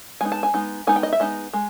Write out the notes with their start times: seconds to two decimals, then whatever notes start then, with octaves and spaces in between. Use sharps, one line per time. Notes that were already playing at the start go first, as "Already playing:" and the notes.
0.21 G#3 B3 D#4 G#5
0.32 A5
0.43 G#5
0.54 G#3 B3 D#4
0.87 G#3 B3 D#4 G#5
0.96 G5
1.03 D#5
1.13 E5
1.20 G#3 B3 D#4 D#5
1.53 G#3